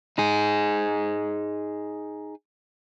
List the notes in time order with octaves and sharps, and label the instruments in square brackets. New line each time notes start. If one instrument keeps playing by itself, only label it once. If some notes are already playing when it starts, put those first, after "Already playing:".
[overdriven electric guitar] D#4 G#4